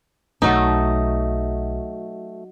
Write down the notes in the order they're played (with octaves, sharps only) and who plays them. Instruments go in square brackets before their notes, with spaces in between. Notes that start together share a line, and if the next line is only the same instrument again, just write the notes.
[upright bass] B1 [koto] F#3 D#4 [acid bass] A3